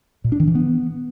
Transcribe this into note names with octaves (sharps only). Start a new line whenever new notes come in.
A#2
D4
D#3
E3
B3